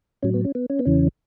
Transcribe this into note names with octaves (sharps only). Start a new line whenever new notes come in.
A2 F#3 C#4
B3
C#4
B3
C#4
B3
E2 C#3 E3 C#4